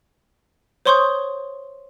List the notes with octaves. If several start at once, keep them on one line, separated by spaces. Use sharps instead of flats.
C5 C#5 C6 C#6 D#6 G6